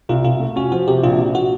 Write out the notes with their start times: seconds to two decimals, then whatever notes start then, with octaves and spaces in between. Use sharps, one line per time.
0.09 C2 F4
0.25 C2 F4
0.40 A3
0.56 C#4 F#4
0.72 F3 F#4
0.88 C3 G4
1.03 A#1 F4
1.19 A#1
1.35 F#4